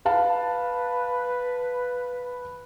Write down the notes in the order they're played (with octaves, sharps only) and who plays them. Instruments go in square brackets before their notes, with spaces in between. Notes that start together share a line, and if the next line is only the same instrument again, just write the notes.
[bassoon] B4 [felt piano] F5 A5